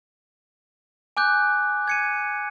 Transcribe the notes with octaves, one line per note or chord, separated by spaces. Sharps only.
G#5 D6 F#6 G6
G#6 C#7 D#7